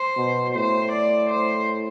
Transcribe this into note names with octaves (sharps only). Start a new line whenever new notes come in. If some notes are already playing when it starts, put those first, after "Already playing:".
Already playing: C5
B2
A2 C5
D5
C5